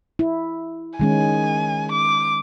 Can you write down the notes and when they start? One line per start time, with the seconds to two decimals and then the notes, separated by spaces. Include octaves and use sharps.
0.19 E4
1.00 D#3 G#3 C#4 G#5
1.92 D6